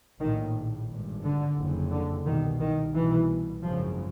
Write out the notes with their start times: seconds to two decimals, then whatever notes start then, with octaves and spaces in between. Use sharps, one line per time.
0.21 A#1 A2 D#3
0.90 G#1 G2
1.23 D3
1.57 F#1 F2 C#3
1.92 D3
2.26 C2 B2 D#3
2.60 D#3
2.94 C2 B2 E3
3.62 G#1 F#2 C#3 F3